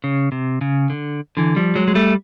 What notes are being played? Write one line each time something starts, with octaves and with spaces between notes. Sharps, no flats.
C#3
C3
C#3
D3
D3 E3
F3 G3
F#3 G#3
G#3
G3 A3